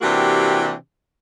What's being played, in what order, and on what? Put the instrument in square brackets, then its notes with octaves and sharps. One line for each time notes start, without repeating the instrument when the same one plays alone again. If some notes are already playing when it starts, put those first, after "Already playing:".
[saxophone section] C3 E3 A#3 D4 F#4 G4